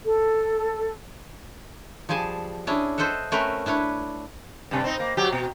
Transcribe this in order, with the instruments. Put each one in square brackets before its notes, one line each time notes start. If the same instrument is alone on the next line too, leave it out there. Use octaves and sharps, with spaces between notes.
[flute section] A4
[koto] F3 G3 G#4 G#5 A5
C#4 D4 E4 G#4
A4 C5 D#5 E5 F#5
A3 C4 C#4 A#4 B4
D4 E4 B4 C#5
[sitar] G2 C3
C4 D#4
A#3
F#3 G4
B2